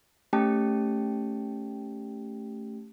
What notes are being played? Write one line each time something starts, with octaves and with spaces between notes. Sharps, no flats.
A3 C#4 G4 G5 A5